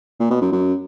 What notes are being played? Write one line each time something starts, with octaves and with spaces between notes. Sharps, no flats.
A#2
B2
F#2
F#2